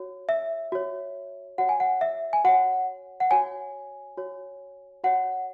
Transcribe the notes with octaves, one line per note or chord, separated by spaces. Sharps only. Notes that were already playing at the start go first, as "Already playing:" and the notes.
Already playing: F#4 C#5
E5
F#4 C#5
F#4 C#5 F#5
G#5
F#5
E5
G#5
F#4 C#5 F#5
F#5
F#4 C#5 G#5
F#4 C#5
F#4 C#5 F#5